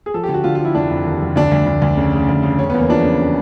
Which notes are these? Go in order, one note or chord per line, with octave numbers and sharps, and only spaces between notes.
G#4
F3 A4
G4
D3
F#4
D3 F4
F4
F3 E4
F1 D4
F1
D#2
F1
D2 D4
D2
D2
D2
C#3
C#3
D2
C#3
E1 C#4
B3
E2 A#3
F3 D4
C#3
C#3